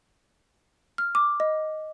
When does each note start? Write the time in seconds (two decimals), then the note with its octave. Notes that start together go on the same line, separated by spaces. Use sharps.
0.98 F6
1.15 D6
1.40 D#5